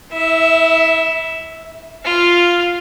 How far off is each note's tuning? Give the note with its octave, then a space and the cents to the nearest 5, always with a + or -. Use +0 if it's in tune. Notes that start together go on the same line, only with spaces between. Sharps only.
E4 -30 E5 +0
F4 +0 F5 -10